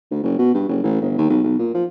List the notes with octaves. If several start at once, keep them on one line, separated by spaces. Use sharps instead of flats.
D2
F#1
B2
G2
F#1
A1
G1
D#2
B1
B1
A#2
F3